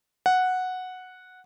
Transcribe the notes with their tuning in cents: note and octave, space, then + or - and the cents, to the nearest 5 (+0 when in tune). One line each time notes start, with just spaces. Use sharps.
F#5 -5